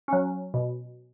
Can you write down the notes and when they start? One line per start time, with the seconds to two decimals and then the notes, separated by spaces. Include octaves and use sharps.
0.08 F#3 C#4
0.54 B2